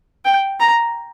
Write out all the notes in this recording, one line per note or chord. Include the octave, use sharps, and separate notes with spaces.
G5
A#5